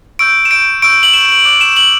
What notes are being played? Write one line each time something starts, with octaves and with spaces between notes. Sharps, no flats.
C#6 E6 G6 D7
E7
D7
C#6 E6 G6 D7
F#7
E7
D6 F#6
E7
F#7